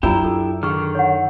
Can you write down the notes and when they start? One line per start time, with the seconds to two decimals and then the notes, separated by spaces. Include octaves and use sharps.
0.03 F#2 D4 E4 F4 G4 B4 A#5
0.25 A4
0.63 D3 D#3 G#4 C#6 F6
0.95 C#5 F#5